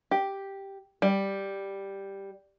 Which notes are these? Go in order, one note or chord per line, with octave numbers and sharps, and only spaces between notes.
G4
G3